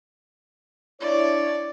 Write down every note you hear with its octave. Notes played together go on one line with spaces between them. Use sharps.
D4 E4 C#5 D5